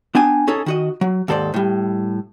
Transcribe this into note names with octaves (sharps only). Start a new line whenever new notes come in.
B3 D4 G5 G#5
C#4 D#4 G#4 A4
D#3 F#4 D#5
F#3
D#2 G#2 A4 C5 D5
A2 G3